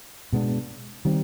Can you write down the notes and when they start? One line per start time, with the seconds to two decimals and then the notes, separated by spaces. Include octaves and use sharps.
0.33 B2 G#3 B3 D4
1.05 D#3 G3 C4